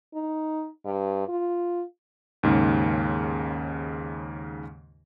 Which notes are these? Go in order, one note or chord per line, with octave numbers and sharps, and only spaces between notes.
D#4
G2
F4
D#2 G#2 C#3